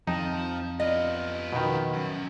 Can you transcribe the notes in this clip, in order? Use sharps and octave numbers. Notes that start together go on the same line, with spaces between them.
F2 F3 D#4 A5
B3 F4 D#5
B2 D#3
F#2